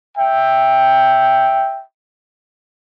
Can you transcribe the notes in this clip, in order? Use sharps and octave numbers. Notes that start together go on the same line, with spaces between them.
E5 G5